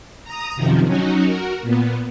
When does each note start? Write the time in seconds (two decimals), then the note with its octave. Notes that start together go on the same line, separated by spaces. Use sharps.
0.24 A#5 D#6
0.56 F#2 C3 D#3 F3
0.86 F#3 C#4 D#4 F#4
1.25 F#4 A#4
1.62 A#2 B3